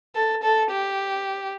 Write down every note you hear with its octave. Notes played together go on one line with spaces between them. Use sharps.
A4
A4
G4